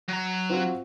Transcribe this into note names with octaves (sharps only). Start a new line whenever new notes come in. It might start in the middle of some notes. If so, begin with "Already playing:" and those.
F#3 A#5
C4 F4 F#4